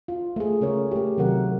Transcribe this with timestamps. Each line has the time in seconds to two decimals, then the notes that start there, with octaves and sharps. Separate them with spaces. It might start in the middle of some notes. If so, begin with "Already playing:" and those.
0.08 F4
0.36 A3 G#4
0.61 C#3 A3 C#4 A#4 C#5
0.91 A3 G4
1.18 C3 D#3 F#3 A#4 F#5